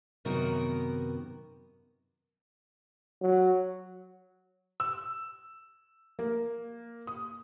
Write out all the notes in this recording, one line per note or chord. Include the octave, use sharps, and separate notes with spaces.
F#2 C3 D#3 B3 F#4 A#4
F#3
E6
A#3
D#6